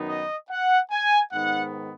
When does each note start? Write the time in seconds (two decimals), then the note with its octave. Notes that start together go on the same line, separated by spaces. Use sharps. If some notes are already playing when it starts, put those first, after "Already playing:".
Already playing: F#2 D#3 B3 D#4
0.08 D#5
0.49 F#5
0.91 G#5
1.33 G#2 D#3 B3 F#5